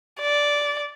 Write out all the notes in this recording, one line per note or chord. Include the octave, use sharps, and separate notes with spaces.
D5